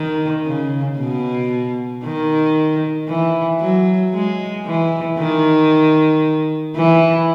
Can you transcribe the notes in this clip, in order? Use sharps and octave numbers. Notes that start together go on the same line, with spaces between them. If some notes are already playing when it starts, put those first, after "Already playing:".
Already playing: D#3
C#3
B2
D#3
E3
F#3
G#3
E3
D#3
E3